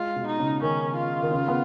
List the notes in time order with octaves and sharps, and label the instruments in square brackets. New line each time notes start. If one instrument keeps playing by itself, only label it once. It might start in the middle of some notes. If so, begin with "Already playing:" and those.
Already playing: [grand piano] G#3 [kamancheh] F4
[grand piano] B2
[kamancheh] D#4
[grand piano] C#3
[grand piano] D#3 [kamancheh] C#4
[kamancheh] F4
[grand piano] D#3
C#3
B3